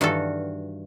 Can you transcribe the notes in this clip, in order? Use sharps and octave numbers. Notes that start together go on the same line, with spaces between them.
G2 D#3 E3 F#4 A4 F5